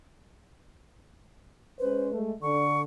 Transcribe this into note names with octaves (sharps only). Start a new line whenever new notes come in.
G#3 C#4 B4 C5
G#3 A3
D3 C#6